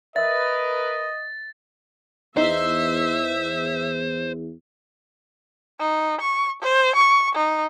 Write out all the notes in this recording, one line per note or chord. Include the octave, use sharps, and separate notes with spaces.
A#4 B4 D#5 E5 E6 A6
E2 D#4 C5 E5
D#4
C#6
C5
C#6
D#4